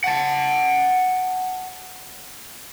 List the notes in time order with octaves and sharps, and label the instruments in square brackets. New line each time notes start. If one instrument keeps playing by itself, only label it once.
[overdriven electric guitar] F#5 A5